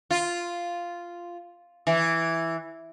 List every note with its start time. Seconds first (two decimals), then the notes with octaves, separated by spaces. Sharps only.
0.11 F4
1.87 E3